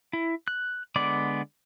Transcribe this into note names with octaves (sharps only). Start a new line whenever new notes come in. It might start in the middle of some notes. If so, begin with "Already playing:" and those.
E4
F#6
D3 G#3 B3 D5 D6